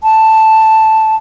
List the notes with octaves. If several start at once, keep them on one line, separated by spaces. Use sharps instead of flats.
A5